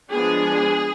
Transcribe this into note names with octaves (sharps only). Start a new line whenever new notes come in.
F3 G#3 B3 D4 G#4